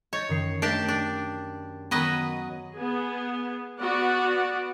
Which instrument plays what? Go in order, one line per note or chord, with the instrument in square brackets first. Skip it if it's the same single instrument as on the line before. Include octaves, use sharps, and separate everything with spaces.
[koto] C#5 [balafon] D#5 [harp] G6 A6
[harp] F#2 D#3 C7
[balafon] A3 D#5 [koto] D4 G4 A5 [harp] A#4
[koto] D4
[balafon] D#3 B3 [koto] F#3 B4 D#5
[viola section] B3 G#4
B3 F#4 D5 F#5